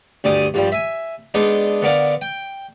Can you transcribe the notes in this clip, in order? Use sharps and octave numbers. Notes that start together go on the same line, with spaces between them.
D2 G2 G3 D5 G#5 D#6
G2 F3 G3
E5 G#5
G#3 B3 D4 D#4
D3 B3 A#4 D5 F5
G5